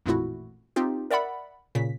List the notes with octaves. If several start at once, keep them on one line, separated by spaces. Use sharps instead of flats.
A1 F2 A#2 A3 E4 F#4
C4 D#4 F4 G4
A#4 D5 E5 F#5 B5
A#2 C#3 B6